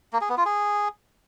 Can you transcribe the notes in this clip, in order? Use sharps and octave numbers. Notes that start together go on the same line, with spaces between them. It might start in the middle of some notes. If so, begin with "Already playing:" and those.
A#3
G#4
B3
F4
G#4